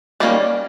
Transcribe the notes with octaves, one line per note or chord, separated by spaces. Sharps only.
D#3 G3 A#3 C#4 D5